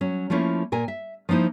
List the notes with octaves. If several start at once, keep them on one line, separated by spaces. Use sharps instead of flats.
F#3 C#4
F3 A3 A#3 C#4 E4
A#2 A#4 G#5
E5
F3 A#3 D#4 E4 C5